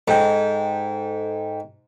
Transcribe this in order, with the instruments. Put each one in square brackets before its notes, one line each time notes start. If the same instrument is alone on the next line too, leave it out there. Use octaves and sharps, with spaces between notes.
[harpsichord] G#2 [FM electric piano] A4 G5